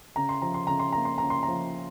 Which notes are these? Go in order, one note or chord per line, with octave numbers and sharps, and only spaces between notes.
C#3 A#5
C6
F3 A#5
C6
C#3 A#5
C6
A#3 A#5
C6
C#3 A#5
C6
A#5
F3